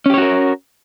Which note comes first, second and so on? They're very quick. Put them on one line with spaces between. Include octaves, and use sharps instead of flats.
C#4 G4 C#5 F#4 A#4